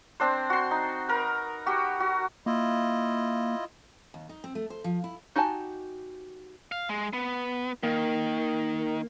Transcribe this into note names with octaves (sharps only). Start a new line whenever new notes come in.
C4 D4 C5
F#4 C6
D#4
A#4 B4
F#4 G4
F#4
A#3 E4 F4 D#5
D#2
D#4
C4
A3
C5
F3
E4
D#4 F#4 G4 G#5 A5
F5
G#3
B3
D#3 A#3